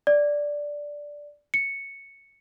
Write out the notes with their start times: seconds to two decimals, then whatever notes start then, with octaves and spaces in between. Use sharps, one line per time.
0.07 D5
1.54 C#7